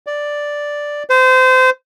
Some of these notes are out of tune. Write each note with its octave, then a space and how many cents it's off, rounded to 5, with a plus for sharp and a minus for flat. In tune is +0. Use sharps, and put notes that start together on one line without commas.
D5 +0
C5 -25